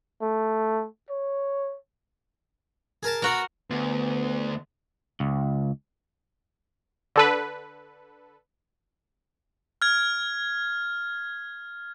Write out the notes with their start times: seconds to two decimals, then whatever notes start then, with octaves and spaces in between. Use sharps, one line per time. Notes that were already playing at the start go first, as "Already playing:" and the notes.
0.22 A3
1.10 C#5
3.03 G#4 A#4 A5
3.22 B3 F#4 A#4 B4
3.70 D2 B3
5.20 C#2
7.16 D3 A4 B4
9.82 F6 G#6